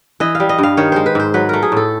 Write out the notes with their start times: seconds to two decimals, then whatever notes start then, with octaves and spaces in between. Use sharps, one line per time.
0.20 E3 D#5
0.35 F5
0.40 G3
0.49 D#5
0.59 G2 F5
0.77 D#3 C#5
0.92 G#3 C5
1.06 B4
1.15 G#2 C5
1.34 F#3 B4
1.49 A3 A#4
1.62 G#4
1.72 A2 A4